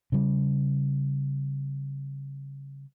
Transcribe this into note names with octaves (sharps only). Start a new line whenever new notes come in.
C#3 G3